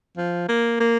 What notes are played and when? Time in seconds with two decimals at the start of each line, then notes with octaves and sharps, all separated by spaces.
0.17 F3
0.48 A#3
0.80 A#3